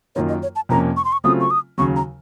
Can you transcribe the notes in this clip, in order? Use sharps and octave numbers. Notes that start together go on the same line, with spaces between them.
F#2 D#3 A#3 F4 C#5
D#5
C#5
A5
F2 C3 F3 A#3 C#4 A#5
C#6
C6
C#6
C#3 F#3 A3 C4 F4 D#6
C#6
D#6
D#2 C#3 F#3 C#6
A#5